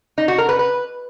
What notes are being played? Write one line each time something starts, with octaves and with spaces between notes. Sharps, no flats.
D#4
F#4
A#4
B4
B4